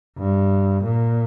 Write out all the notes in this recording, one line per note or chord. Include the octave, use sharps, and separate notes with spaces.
G2
A#2